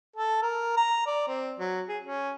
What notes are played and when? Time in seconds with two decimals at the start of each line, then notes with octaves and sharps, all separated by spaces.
0.16 A4
0.43 A#4
0.77 A#5
1.07 D5
1.28 C4
1.59 F#3
1.89 G#4
2.03 C#4